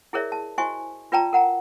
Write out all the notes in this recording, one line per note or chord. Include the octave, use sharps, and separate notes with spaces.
E4 G#4 A#4 C#5 D5 E5
A5
E4 F#4 C5 D#5 G#5 C#6
F4 B4 D5 G5 A5 A#5
A#4 F#5 A#5